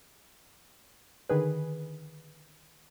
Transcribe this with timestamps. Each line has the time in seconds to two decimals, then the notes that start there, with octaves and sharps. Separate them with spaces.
1.29 D3 D#3 G#4 B4